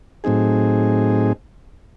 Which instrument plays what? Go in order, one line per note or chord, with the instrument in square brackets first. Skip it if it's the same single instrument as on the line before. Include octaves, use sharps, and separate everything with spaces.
[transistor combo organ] A2 F#3 C4 D#4 G#4